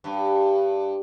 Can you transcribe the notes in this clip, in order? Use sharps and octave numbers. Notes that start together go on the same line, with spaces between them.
G2